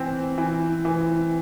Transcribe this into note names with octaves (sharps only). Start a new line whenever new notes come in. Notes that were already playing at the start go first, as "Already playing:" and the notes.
Already playing: E3 C4
E3
E3